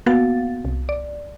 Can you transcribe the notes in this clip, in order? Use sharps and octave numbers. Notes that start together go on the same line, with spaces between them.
A#3 B3 F#4 F5 F#5 A6
C2
D5